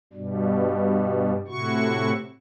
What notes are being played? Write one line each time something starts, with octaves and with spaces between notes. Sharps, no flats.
G2 B2 G3
A2 C3 E4 F#4 C#6